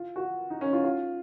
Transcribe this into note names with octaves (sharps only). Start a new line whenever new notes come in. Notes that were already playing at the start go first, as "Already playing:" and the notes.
Already playing: F4
F#4
D#4
C#4
F4
F4